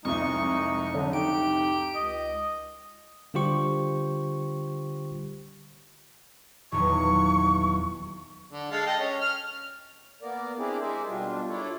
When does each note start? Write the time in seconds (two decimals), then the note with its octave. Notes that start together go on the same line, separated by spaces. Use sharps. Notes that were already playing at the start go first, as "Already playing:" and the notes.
0.05 C2 F2 G#3 D#4 C#6
0.94 D3 F#3
1.13 D#4 G4 D7
1.95 C#2 D#5
3.34 D3 G3 F4 G4 C5 C#6
6.72 D#1 E2 F#3 C#6
8.52 D3
8.71 G#3 A4 F5
8.86 D#5 G5 A5
8.99 C#4
9.21 F6
10.22 A#3 B3 A#4 D5
10.59 C4 D4 E4 G4 G#4 D5
10.81 G#3 G#4 A#4 C5 D5 E5
11.08 B2 G3 D4 F4
11.49 D4 E4 F4 A4 C#5 D5